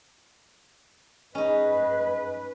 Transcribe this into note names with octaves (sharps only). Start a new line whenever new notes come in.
C#4 D#4 G#4 B4 D#5